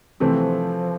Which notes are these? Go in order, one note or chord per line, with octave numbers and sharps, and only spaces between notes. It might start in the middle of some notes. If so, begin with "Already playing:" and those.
C3 E3 F3 A3 C4